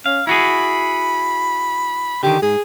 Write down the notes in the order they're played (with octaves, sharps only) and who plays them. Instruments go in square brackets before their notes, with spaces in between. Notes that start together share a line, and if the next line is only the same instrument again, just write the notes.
[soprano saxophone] C#4 [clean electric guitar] F5
[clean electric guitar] E4 F#4 G#4 [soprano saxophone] B5
[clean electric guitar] D3 D#3 [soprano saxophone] G4
[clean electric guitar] G#2 [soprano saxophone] G#4